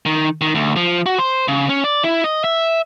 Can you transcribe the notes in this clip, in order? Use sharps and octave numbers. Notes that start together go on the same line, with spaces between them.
D#3
D#3
D2
F3
F#4
C5
C#3
C#4
D5
E4
D#5
E5